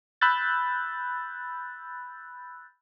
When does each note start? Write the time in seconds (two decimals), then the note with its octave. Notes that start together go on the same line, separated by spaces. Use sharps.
0.21 B5 E6 F#6 G6 A6